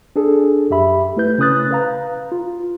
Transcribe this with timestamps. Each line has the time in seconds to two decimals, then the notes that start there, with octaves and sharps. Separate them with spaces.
0.16 D4 G#4 A4
0.70 F#2 G4 E5 B5
1.17 A3 E4 B4 G6
1.38 C#3 C#4 B4 D#6 F#6 A6
1.71 B4 F5 A#5
2.32 F4